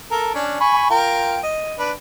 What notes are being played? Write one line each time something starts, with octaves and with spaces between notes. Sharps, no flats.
A4 A#4
C#4 D4
G#5 B5 C#6
F4 A#4 G5
D#5
D4 B4